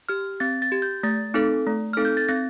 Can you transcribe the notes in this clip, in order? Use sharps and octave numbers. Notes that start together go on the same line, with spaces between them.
G4 F6
C4 A6
A6
G4
G6
A3 A6
C4 D#4 A4
A3
C4 D#4 A4 F6
G6
A6
C4 A#6